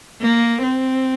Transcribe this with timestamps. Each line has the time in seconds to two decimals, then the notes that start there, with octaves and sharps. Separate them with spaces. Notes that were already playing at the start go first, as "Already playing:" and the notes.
0.22 A#3
0.63 C4